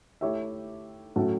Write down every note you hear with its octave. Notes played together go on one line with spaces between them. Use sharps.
A3 E4 G4 C#5 E5
A2 F#3 A3 C#4 F#4